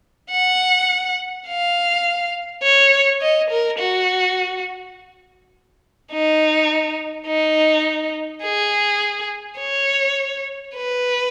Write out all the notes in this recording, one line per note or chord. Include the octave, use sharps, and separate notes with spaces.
F#5
F5
C#5
D#5
A#4
F#4
D#4
D#4
G#4
C#5
B4